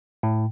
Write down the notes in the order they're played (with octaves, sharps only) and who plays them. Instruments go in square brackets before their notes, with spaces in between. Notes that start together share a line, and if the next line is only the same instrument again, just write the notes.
[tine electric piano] A2